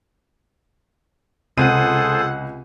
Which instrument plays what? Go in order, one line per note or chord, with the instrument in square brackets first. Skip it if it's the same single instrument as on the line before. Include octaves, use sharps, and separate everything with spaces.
[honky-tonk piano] C#2 D#7 [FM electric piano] C3 [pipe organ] G#4 A4 C5 [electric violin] F#5